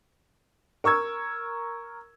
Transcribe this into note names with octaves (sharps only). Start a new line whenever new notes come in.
A#4 C#6 E6 G#6